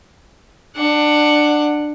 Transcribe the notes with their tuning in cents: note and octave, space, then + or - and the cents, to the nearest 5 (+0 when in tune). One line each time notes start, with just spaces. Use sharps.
D4 +20 F#5 +0